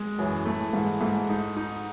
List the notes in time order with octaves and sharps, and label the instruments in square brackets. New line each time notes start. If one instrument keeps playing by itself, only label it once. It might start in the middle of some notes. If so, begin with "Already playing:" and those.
Already playing: [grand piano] G#3
[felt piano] F#2 [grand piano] E3
[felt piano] A2 [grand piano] A3
[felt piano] G#2 [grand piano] E3
[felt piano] G#2 [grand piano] A3
[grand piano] D#4
D#4